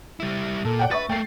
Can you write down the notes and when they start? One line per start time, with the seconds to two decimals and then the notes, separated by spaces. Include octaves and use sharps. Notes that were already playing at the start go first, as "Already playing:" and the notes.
0.20 G3 E4
0.65 A#2 A4
0.79 D5 F#5 G5
0.91 B4 E5 C#6 A6
1.09 A3 A#3 G5 C7